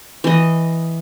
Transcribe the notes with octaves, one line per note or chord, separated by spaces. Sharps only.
E3 D#5